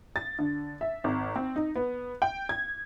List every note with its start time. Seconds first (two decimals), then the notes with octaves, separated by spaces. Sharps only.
0.16 A6
0.39 D3
0.81 E5
1.04 G#1
1.36 C4
1.56 D#4
1.76 B3
2.22 G5
2.49 G#6